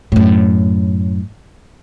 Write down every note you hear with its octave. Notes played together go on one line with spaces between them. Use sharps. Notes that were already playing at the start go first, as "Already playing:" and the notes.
F#2 A2